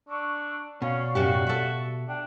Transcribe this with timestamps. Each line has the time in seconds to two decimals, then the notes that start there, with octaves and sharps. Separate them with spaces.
0.09 D4 C#6 E6
0.82 B2 C#4 D5 F5 C#6
1.15 F#2 A2 F#4 G4
1.47 A4 E5
2.09 D4 F#5 G5